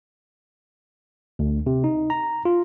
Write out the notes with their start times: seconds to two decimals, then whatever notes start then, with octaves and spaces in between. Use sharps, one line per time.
1.39 D2
1.66 C3
1.84 D#4
2.10 A#5
2.45 F4